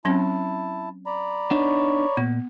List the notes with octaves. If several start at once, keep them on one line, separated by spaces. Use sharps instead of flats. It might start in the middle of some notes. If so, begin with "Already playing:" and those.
F#3 C4 C#4 E4 A5
D5 A#5 B5
B3 D4 D#4 C#5
A#2 B3